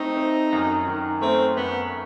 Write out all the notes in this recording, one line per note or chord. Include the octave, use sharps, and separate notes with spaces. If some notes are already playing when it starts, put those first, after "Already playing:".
Already playing: A3 C4 D#4
C4
F#2
D#3
A3 C4
F#2 B3